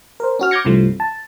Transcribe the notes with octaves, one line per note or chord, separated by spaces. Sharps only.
A#4 C5
C#4 F#4 F6
D6 F6 G6 G#6 A#6 C#7
C2 G2 C3 E3 F3 A3
A5